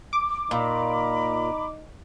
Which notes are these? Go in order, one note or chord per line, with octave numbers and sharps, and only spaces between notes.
D6
A#2 D#4 A#5 B5